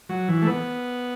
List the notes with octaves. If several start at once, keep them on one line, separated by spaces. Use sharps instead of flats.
F#3
E3
A3
B3